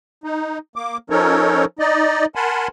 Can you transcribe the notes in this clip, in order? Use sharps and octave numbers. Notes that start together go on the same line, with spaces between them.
D#4
A#3 D6
F3 C#4 D#4 A4 A#4 C#5
D#4 D5 D#5
A#4 F#5 G#5 A5 B5 C6